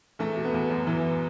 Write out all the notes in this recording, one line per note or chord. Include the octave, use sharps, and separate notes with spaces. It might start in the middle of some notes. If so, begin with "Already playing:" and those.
E2 A3
B2
B3
E2
F#2
E3